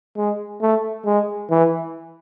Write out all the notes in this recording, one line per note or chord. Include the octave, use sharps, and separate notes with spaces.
G#3
A3
G#3
E3